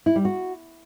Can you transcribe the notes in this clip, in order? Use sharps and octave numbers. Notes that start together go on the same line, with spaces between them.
E4
G3
F#4